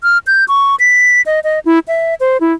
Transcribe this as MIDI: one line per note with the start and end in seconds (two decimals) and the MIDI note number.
0.03 0.18 89
0.27 0.45 91
0.48 0.75 85
0.80 1.21 95
1.26 1.40 75
1.44 1.59 75
1.66 1.79 64
1.88 2.15 76
2.20 2.37 72
2.41 2.53 64